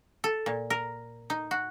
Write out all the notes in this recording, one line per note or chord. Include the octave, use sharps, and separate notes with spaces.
A4
A#2
A#4
D#4
F#4